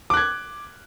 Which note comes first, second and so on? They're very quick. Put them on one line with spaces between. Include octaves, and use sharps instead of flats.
D6 F#6 G#6